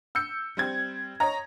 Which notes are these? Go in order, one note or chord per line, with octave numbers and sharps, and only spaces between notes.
E6 G6 C#7
G3 C4 G#6
C#5 D#5 A#5